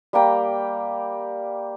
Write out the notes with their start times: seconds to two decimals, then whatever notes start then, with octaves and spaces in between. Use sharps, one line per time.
0.13 G3 A#3 G5 A#5